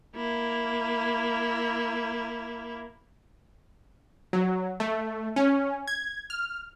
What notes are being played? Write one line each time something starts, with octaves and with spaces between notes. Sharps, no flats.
A#3 E4
F#3
A3
C#4
G#6
F6